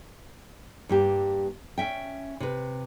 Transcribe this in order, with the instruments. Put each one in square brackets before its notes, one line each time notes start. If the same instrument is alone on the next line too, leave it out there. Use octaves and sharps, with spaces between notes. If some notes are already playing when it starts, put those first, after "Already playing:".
[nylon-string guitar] G2 A#3 G4
C#4 E5 G5
C3 B4